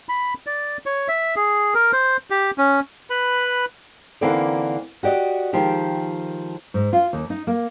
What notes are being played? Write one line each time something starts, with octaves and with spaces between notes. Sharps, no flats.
B5
D5
C#5
E5
G#4
A#4
C5
G4
C#4
B4 B5
D3 E3 A#3 C4 D#4 D5
F#4 G4 D5 D#5
D#3 F3 G#3 G4
G#2
F4
D#2
D#4
A#3